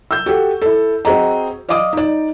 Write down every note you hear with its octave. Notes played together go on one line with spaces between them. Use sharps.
E6 G6
F#4 G4 A4
E4 A4
C4 F#4 G#4 D#5 A#5
D5 D#5 F5 D6 D#6
D#4 D5